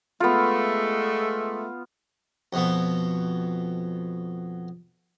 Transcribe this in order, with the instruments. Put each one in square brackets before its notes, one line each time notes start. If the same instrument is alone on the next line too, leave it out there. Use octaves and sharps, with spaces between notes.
[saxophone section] G#3 A3 [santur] B3 F4
[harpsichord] F2 B2 B3